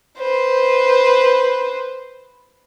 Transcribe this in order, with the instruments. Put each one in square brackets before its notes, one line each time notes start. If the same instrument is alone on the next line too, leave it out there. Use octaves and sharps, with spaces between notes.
[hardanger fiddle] B4 C5